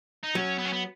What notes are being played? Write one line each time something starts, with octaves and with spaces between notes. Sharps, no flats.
D#4
F#3 C#4
B3
C#4
B3